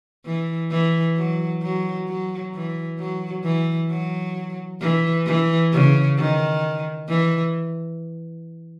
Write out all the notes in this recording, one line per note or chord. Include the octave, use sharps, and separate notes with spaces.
E3
E3
F#3
F#3
F#3
E3
F#3
E3
F#3
E3
E3
C#3
D#3
E3